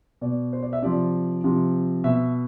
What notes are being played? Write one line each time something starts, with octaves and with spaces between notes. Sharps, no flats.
B2 D5
C5
D5
E5
C3 F3 D5
C3 F3
B2 E5